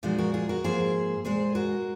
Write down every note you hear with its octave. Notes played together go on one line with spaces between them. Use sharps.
A#2 F3 G#3 D#4 F#4
F#4 A#4
F4 G#4
F#4 A#4
G#2 F3 A#3 G#4 C5
A#2 G#3 G#4 C5
F#4 A#4